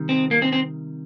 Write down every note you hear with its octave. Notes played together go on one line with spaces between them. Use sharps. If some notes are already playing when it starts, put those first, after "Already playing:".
Already playing: C3 D#3 G3
C4
A#3
C4
C4